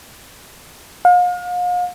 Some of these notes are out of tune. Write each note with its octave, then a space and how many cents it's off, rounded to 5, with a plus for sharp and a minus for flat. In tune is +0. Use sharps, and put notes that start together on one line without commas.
F5 +40